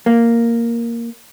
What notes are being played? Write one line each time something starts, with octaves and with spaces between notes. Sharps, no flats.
A#3